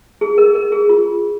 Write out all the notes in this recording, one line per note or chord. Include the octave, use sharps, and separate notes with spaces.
G#4
A#4
A#4
G#4
F4